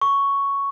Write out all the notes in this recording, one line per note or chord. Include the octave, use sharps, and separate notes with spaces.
C#6